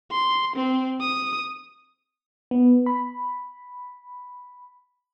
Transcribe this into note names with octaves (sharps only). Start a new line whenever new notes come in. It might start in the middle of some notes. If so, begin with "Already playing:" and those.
C6
C4
D#6
B3
B5